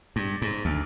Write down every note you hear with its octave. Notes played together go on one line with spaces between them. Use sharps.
G2
G#2
D2